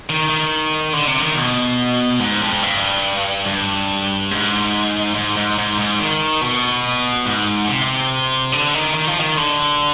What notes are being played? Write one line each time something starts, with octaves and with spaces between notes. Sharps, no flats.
D#3
D#3
D3
C3
D#3
B2
G#2
F2
G2
G2
G#2
G#2
G#2
G#2
G#2
D#3
B2
G#2
C3
D3
D#3
D#3
F3
D#3
D3